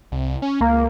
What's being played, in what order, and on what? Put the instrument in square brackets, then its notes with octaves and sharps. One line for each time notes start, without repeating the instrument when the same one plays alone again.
[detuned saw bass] C2
C#4
[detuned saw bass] C#2 [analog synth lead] A#3